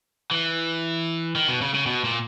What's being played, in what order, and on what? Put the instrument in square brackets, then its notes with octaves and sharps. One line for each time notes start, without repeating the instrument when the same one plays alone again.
[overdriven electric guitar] E3
D#3
B2
C#3
C#3
B2
A#2